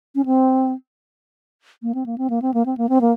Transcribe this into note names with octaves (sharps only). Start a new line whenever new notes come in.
C#4
C4
A#3
C4
A#3
C4
A#3
C4
A#3
C4
A#3
C4
A#3